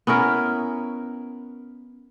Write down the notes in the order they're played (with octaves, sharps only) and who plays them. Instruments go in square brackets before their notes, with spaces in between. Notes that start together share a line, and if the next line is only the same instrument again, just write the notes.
[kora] B3 C#4 E4 A#4